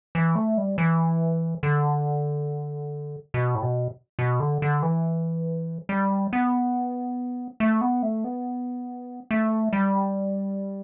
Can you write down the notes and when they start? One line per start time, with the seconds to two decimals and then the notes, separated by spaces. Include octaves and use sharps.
0.15 E3
0.35 A3
0.58 G3
0.78 E3
1.63 D3
3.34 B2
3.55 A2
3.62 B2
4.19 B2
4.40 D3
4.62 D3
4.83 E3
5.89 G3
6.33 B3
7.60 A3
7.81 B3
8.03 A3
8.24 B3
9.31 A3
9.73 G3